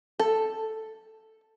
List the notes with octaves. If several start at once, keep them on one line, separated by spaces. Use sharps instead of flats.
A4